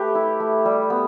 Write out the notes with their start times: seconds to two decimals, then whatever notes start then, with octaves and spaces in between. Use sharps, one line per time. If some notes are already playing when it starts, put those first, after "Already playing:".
Already playing: A3 G4 B4
0.15 E4
0.40 A3
0.65 G3
0.90 B3